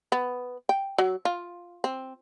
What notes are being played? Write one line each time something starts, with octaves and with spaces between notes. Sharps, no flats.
B3
G5
F#3
F4
C4